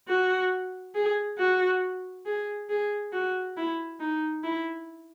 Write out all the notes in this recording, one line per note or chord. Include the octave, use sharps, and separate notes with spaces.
F#4
G#4
F#4
G#4
G#4
F#4
E4
D#4
E4